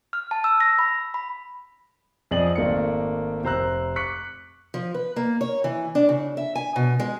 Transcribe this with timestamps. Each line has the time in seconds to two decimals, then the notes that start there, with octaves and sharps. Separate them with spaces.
0.13 F6
0.31 A5
0.44 E6
0.60 A#6
0.79 B5
1.14 B5
2.31 F2 G#4 D5 D#5 F#7
2.55 G#1 A3 A#3 A#4 D5 C#7
3.44 F1 C5 A#5 E6 F#6
3.96 C#6 D6 F#6 B6 C#7
4.74 F3
4.94 B4
5.16 A#3
5.41 C#5
5.64 E3
5.95 D4
6.09 C#3
6.37 E5
6.55 G#5
6.76 B2
7.00 G#3